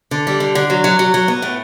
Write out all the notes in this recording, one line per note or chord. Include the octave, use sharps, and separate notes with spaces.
D3
G3
D3
D3
F#3
F#3
F#3
F#3
B3
A2